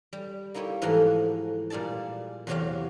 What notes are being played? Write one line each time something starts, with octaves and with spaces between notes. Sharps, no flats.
G3
A#3 D#4 E4 G4 C#5
G#2 E3 F3 A3 F#5 A#5
A#2 G3 G#4 D5 A5
E2 C3 F#3 F#4 G4 F5